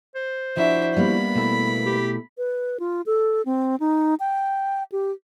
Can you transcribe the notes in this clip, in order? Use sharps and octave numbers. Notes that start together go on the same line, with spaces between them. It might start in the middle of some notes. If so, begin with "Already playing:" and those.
C5
F3 D4 E4 F#4 E5
G3 A#3 B3 B5
B2 A3 E4
G4
B4
F4
A4
C4
D#4
G5
G4